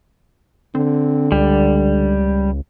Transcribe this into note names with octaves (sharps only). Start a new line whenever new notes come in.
D3 C4
C#2 G3